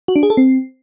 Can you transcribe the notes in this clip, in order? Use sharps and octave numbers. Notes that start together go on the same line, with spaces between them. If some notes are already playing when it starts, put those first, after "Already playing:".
F#4
D4
G#4
A4
C4